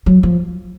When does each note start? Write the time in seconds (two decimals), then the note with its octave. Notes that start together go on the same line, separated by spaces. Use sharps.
0.06 F#3
0.23 F3